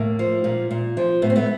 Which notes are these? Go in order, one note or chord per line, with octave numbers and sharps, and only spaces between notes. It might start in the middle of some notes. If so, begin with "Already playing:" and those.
Already playing: A2 A#3
F3
A#2
A#2
F3
A2 B3
C4
A3 B3